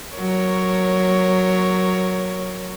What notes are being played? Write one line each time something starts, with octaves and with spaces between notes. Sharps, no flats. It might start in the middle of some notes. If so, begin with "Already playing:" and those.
F#3 A#4 C#5